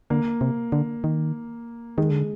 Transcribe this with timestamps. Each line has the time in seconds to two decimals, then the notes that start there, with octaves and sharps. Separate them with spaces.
0.10 D3 A#3
0.41 C3
0.72 D3
1.04 D#3
1.97 D#3 G#3
2.10 D3